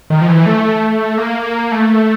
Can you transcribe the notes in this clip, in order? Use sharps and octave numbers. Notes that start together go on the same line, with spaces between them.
D#3
F3
E3
A3
A#3
A3